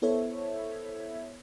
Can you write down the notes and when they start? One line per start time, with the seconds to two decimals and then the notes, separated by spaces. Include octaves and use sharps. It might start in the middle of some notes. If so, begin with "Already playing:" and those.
0.02 B3 E4 A4 C5 C#5 E5